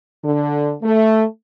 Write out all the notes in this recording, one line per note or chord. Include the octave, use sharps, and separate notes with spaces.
D3
A3